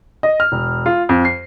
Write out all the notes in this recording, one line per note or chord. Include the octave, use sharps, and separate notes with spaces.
D#5
F6
E1
F4
F2
C7